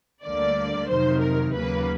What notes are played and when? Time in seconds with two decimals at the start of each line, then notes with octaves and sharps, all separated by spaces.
0.24 D2 D3 G3 A#3 D5
0.89 F2 C3 D#3 F#3 C5
1.21 A#4
1.53 D#2 C#3 F#3 A#3 B4